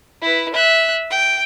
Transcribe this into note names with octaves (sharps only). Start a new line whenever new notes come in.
E4 B4
E5 F#6
G5